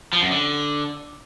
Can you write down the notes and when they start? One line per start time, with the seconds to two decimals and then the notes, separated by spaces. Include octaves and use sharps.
0.13 F3
0.22 F#2
0.31 D3